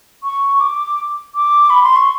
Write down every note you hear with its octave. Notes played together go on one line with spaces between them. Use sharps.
C#6
D6
D6
B5
C6
C#6